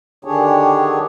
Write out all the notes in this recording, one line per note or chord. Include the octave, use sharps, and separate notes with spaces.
D3 D#3 D4 G4 G#4 C#5